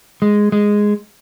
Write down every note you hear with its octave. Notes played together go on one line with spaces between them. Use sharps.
G#3
G#3